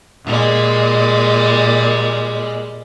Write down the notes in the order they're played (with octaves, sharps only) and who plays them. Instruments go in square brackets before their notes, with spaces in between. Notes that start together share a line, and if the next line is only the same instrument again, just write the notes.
[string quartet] A#2 G3 G#3